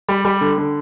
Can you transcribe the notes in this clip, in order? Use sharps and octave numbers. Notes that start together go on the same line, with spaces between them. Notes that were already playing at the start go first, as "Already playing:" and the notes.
G3
G3
D3
D3